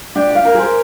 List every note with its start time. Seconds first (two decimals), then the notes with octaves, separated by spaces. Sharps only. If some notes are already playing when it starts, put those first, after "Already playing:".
0.15 D4 G4
0.30 G4
0.35 F5
0.45 A#4
0.55 G#4 C5